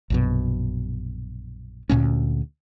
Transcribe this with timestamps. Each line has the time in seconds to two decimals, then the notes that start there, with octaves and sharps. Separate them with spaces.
0.10 A#1 F#2 B2
1.89 D2 A#2 B3 C#4